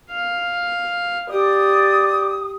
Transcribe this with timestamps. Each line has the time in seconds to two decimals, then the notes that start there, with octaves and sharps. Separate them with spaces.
0.11 F5
1.29 G4 D5 D#6